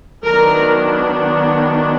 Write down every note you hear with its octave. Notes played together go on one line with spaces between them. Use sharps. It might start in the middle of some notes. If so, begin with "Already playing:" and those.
D#3 F#3 B3 D4 A#4